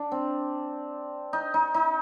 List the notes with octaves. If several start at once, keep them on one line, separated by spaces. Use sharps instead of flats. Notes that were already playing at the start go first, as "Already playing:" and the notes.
Already playing: D4
C4
D#4
D#4
D#4